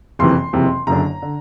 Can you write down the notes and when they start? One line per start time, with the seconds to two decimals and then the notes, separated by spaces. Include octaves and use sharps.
0.19 F#1 F2 C3 E3 C6
0.53 F#1 F2 C3 E3
0.87 F#1 F#2 D3 A#5
1.22 D3